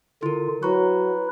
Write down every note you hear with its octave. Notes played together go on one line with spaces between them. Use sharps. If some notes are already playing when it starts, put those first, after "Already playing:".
D3 E4 F4 A#4
F#3 E4 B4 A#5 C#6